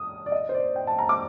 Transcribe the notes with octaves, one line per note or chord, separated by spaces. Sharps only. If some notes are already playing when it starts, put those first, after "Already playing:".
Already playing: D#6
D5
D#5
C5
D5
G5
A5
A#5
D6